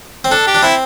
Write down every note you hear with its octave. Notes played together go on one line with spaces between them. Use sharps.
C4
D4 A4
G4
D4
C4 E4